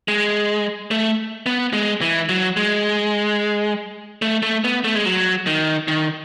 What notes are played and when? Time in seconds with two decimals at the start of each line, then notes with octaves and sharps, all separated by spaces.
0.08 G#3
0.91 A3
1.46 B3
1.73 G#3
2.01 E3
2.29 F#3
2.57 G#3
4.22 A3
4.43 A3
4.64 B3
4.84 A3
4.95 G#3
5.06 F#3
5.47 D#3
5.88 D#3